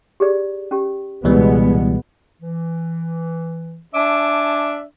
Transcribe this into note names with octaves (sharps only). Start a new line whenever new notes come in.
G4 G#4 D5
C#4 G4
C#2 B2 E3 G3 G#3 B3
E3
D4 E5 G#5 A5 D6